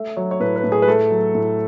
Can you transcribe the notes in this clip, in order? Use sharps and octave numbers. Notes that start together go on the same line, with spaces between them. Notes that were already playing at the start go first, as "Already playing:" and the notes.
Already playing: A3 E5
F#3 C#5
C#5
A2 B4
B4
A2
G#4
B4
A3 A4
F#3
A2